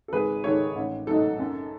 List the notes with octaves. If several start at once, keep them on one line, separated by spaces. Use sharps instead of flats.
A4
G#1 G#4 B4
G#2 D#3 G#3 A4 C#5
A1
G#2 F#3 A3 D#4 A4
F#2